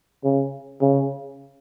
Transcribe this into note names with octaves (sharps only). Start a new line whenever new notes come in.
C#3
C#3